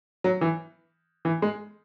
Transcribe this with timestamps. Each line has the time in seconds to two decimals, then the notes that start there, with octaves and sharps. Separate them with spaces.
0.24 F#3
0.41 E3
1.25 E3
1.42 G#3